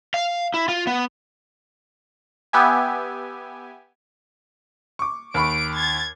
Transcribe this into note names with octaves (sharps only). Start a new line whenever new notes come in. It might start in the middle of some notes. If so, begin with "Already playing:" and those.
F5
E4
F4
B3
B3 G4 E5 G#5
C#6 D6
D#2 B5 C#6 D7
G#6 A6